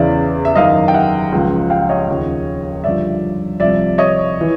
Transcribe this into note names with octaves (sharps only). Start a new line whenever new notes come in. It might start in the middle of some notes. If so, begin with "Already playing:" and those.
Already playing: E2 C#3 E3 D5 E5
E5
F#2 D#3 D#5 F5
G5
E5 F#5
C#2 C#3 F3
F5 G5
C#5 D#5
D#2 C#3 F3
G2 D3 F3 D5 E5
C2 C3 F3 D5 E5
C#5 D#5
E3